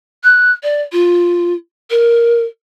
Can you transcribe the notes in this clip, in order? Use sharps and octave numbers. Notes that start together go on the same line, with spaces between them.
F#6
D5
F4
A#4